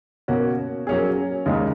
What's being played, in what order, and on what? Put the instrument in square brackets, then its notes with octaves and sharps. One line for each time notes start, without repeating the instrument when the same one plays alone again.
[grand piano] B2 A#3 C#4 F#4
F#3 A#3 C#4 G#4
D#2 C#3 G#3 D#4